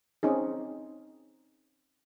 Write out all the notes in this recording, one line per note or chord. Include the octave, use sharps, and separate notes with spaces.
C4 C#4 D#4 G#4